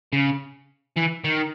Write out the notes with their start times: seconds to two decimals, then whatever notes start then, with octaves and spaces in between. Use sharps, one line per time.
0.13 C#3
0.96 E3
1.24 D#3